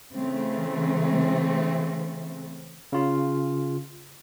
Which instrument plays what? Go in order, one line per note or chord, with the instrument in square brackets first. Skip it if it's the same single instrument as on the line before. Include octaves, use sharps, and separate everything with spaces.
[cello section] C#3 E3 A3 C4
[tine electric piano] C#3 F4